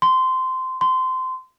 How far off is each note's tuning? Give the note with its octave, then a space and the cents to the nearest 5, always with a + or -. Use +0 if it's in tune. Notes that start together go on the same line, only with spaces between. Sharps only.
C6 -15
C6 -20